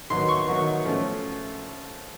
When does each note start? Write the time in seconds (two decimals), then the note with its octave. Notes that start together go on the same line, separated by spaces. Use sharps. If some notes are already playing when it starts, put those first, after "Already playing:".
0.10 D#3 F#3 B3 C6
0.29 C#6
0.48 D#3 F#3 B3
0.85 F3 A3 C#4